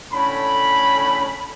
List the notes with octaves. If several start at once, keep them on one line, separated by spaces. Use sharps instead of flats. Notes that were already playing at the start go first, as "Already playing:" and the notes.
A2 D3 C#4 B5